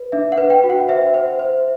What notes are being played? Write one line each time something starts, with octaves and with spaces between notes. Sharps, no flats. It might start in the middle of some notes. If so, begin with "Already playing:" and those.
Already playing: B4
D4 E5
F#5
B4
G5
F#4
F#5
C5 E5
C5
C5